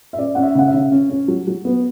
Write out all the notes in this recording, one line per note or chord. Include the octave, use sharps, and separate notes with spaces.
E5
C#4 D5
C#4 F#5
E5
C#3 F#5
E5
C#3
C#4
C#4
F#3
F#3
B3